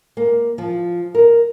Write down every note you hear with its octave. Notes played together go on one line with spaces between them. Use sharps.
A#3
F3
A#4